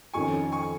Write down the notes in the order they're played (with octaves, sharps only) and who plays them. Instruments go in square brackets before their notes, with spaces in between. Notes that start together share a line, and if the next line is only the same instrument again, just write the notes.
[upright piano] F2 D#3 C#4 [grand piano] G#5 C#6
[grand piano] G#5 C#6